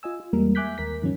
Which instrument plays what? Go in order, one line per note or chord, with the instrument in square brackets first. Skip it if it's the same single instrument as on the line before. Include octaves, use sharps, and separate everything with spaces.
[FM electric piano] F4 D#5 G#5 E6
F4
E2 G3 G#3 A#3 A#4
E5 G#5 D6 F#6 G6 B6
D#2 A#4 B6
G2 D#3 F3 F#3 C#4 D#4